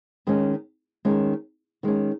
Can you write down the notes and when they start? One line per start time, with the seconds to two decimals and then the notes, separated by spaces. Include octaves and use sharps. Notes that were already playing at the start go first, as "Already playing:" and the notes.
0.27 D#3 G#3 C#4
1.05 D#3 G#3 C#4
1.83 D#3 G#3 C#4